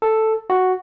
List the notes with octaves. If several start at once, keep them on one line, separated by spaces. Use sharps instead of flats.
A4
F#4